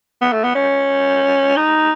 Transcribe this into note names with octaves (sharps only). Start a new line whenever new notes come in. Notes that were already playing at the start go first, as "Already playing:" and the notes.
B3
A3
B3
C#4
D#4